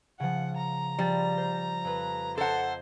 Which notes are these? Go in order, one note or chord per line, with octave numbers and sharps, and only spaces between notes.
C#3 F3 F#5
A#5
F3 G3 A6
C5
F2 B4
A4 C5 D#5 F#5 A#5 G#6